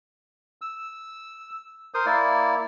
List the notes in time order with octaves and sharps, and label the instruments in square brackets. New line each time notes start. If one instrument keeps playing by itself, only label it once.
[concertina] E6
A#4 C5 D#6
A#3 E4 D5